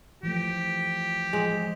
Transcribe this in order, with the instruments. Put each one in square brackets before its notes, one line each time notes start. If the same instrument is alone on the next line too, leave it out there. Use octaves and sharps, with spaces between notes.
[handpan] E3 F3 A3 [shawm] G4
[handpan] F3 [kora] G#3